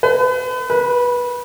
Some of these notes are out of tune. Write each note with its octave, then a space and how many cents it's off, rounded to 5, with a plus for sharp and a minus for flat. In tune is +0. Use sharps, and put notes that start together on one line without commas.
B4 +35
B4 -20